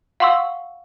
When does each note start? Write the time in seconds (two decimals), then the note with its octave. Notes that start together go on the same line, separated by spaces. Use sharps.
0.20 F5 F#5 C6 C#6 E6